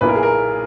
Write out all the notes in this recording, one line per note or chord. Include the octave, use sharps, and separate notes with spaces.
B1 A#2 A#3 E4 B4
A#4
G#4
A#4